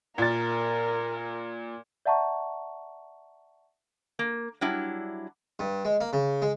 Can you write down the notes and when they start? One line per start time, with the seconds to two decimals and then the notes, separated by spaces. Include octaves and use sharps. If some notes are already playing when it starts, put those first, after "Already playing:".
0.18 A#2 A#4 A6
2.06 D5 E5 F#5 A5 A#5 C#6
4.19 A#3
4.61 F#3 G3 D4 E4
5.59 G2
5.85 G#3
6.01 A#3
6.13 C#3
6.42 G#3